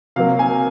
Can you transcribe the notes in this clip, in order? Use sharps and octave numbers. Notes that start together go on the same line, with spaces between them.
C3 F#3 A#3 F5
G#5